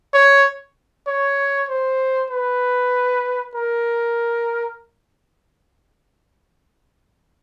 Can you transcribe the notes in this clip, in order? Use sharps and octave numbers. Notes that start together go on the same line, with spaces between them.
C#5
C#5
C5
B4
A#4